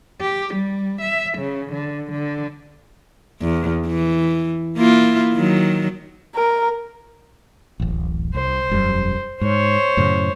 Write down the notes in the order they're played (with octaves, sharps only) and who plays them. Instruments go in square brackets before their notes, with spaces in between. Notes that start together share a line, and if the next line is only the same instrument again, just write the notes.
[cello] G4
G3
E5
C#3
D3
D3
[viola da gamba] E2
E3
A#3 E4 F4
D#3 F#3
[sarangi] A#4
[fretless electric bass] D1 A1
[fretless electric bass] C2 [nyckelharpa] C5
[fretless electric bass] E1 F#2 G3
[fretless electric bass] G#2 [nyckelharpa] C5 C#5
[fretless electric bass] F#2 A2 C#3